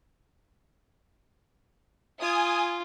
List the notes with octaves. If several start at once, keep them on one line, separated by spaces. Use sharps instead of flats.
F4 G#5 D#6